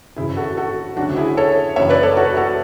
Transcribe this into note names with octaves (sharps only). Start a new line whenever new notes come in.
G#1 F#2 C#3 E3 E4 G#4
F#4 A4
F#4 A4
D2 C#3 F#3 D4 F#4
E4 G#4
A4 C#5
F#1 F#2 E3 C#5 E5
B4 D5
A4 C#5
F#4 A4
F#4 A4